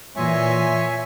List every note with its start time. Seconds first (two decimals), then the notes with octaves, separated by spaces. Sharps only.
0.16 A#2 E3 C#5 E5 G#5 C6